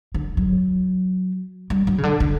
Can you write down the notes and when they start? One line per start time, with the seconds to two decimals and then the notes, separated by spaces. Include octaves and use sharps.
0.14 D3
0.37 F#3
1.70 G3
1.87 F#3
1.98 C#3
2.03 D3
2.20 D3